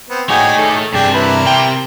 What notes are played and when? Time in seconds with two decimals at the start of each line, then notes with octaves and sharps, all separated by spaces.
0.10 B3 C4
0.29 A3 D#4 F#4 G#4 C#5 D5 G5 G#5
0.58 D#3 A4
0.94 G2 C3 D4 G#4 D5 G5 A5
1.14 E4 A#4 B4
1.46 C3 G5